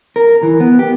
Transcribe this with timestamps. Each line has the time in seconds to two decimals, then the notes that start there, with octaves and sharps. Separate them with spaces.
0.16 A#4
0.43 E3
0.60 B3
0.79 G4